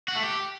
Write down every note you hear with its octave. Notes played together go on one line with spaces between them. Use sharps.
F#4
A3
G4